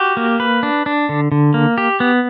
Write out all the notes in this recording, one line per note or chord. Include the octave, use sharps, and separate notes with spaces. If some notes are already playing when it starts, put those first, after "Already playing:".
Already playing: F#4 G4
A#3
B4
D4
D4
D3
D3
A#3
G4
B3